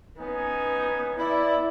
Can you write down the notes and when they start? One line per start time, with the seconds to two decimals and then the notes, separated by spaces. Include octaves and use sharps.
0.18 B3 C#4 D#4 G#5
1.19 E4 D5